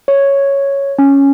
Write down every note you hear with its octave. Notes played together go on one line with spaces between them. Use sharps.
C#5
C#4